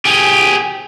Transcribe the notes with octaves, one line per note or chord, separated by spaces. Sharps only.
G4 G#4